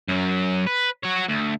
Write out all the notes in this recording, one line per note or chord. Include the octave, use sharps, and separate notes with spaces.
F#2 F#3
B4
F#4 C#5
D2